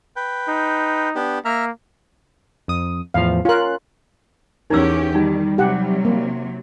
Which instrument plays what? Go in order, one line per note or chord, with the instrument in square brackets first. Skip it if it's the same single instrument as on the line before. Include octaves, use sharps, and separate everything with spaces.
[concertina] B4 G5
[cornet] D#4
[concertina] B3 D4 G4
[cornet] A#3 [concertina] E5 A#5 F6
[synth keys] F2 D#6
[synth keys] E2 A2 F3 [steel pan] F5
[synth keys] C#4 F#6 [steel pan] F4 A#4
[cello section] E2 C#4 G4 [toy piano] D#4 E6 [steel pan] A#4
[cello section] D#3 [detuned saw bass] G3 [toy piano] D#4
[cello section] C3 F#3 [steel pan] G4 F#5
[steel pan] A#3